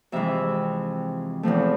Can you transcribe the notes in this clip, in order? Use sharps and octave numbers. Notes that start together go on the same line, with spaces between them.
F2 C3 E3 G#3 E5
E2 C3 F3 A3